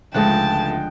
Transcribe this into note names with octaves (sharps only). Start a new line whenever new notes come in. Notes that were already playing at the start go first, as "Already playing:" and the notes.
C#2 D3 F3 G#3 A3 G5 A5 F#6